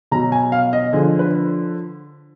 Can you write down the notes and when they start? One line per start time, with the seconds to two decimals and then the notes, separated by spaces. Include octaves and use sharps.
0.12 B2 F#3 A#5
0.32 G#5
0.52 F5
0.73 D#5
0.93 D3 F3 G#4
1.19 B4